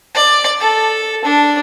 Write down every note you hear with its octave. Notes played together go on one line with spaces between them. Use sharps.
D5
A4
D4